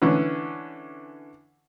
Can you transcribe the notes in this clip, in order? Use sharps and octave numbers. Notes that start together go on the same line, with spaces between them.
D3 E3 C#4